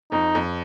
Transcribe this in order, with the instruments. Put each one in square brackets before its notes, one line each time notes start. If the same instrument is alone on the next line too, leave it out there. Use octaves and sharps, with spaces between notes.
[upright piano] F2 [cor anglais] D#4
[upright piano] F2